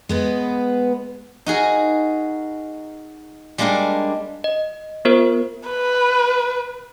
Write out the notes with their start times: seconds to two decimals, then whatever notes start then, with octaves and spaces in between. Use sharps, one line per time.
0.09 G#3 B3 B4
1.46 D#4 F#4 G#4 A#4
3.58 G3 G#3 A#3 D4 A#4
4.44 D#5
5.05 B3 F4 A#4 C5
5.69 B4